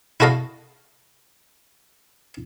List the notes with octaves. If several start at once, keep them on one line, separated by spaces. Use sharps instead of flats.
E4 F#4 A4 D#5 F5